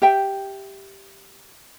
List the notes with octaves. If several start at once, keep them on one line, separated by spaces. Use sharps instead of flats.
G4 E5 G5